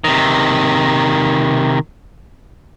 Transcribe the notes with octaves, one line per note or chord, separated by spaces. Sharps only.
C3 D#3